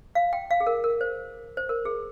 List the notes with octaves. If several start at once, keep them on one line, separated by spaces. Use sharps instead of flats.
F5
G5
F5
G#4
A#4
A#4
C5
C5
A#4
G#4